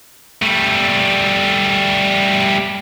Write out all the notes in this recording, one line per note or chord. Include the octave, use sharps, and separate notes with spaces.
G3 A3